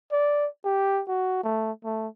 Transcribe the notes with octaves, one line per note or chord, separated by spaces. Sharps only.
D5
G4
F#4
A3
A3